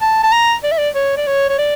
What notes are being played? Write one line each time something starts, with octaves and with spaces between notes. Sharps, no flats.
A5
A5
A#5
D5
E5
D5
C#5
D5
C#5
C#5
D5